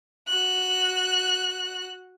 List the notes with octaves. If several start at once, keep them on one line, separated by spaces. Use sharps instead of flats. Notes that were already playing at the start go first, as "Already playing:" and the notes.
F#4 F#6